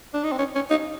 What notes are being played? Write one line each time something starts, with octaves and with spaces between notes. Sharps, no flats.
D4
D#4
C4
C#4
C#4
D#4